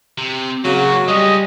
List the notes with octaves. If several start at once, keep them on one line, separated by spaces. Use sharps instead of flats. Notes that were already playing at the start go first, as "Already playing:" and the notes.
C3
A#2 C#3 F#3 F#4
G3 G#3 C#4 D#5